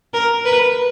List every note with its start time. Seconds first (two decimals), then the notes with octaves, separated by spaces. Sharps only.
0.13 A#4
0.45 B4